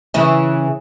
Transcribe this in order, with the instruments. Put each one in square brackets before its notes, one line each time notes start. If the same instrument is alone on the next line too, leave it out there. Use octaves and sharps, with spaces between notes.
[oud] C#3 E3